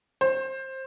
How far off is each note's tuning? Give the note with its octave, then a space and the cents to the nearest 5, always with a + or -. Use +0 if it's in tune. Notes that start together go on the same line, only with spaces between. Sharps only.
C5 +15